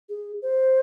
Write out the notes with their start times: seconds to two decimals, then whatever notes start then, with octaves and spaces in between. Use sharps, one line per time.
0.09 G#4
0.42 C5